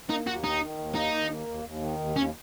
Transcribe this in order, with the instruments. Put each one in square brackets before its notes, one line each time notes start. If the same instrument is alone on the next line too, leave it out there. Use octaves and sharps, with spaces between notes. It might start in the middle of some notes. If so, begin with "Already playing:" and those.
[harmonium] A#3 [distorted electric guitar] D#4
[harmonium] D#2 [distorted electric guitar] F#4
[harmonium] D#3 [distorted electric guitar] D#4
[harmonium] D#3
D#2
[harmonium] A#3 [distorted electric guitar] D#4
[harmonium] D#2
A#3
D#2
D#2
D#3
D#2
[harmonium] D#2 [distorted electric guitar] C#4